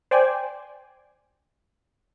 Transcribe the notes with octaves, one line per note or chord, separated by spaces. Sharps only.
C5 D5 G5 G#5